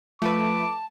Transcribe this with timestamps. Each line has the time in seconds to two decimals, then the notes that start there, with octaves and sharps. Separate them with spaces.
0.22 F3 A3 B4 A5 D6